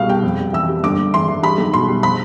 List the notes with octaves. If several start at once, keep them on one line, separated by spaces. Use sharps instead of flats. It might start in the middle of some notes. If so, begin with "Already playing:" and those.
Already playing: C2 B2 F5
G3 G5
F2
G3
E3 E6
G3
G1 D6
G1
E3 C6
E3
G3 B5
B1
B2 C6
G3
F3 B5